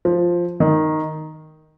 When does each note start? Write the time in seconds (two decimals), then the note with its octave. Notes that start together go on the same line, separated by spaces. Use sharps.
0.05 F3
0.60 D#3